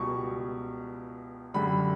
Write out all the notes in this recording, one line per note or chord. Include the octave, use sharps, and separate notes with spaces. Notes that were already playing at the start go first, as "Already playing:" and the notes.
Already playing: C#2 B2 G3 C#6
F#2 D3 G3 B5